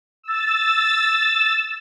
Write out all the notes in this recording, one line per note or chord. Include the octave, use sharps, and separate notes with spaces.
E6 A6